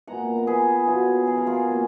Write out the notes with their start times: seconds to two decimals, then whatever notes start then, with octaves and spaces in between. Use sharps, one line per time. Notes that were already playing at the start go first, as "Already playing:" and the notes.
0.07 A#2 G#3 B3 F#5 A#5
0.37 A#4
0.47 G#4 B4
0.87 B2 F#3 B3 F4 G#4
1.27 G#4
1.37 A#4
1.47 F4 G#4
1.68 B2 F#3 A#3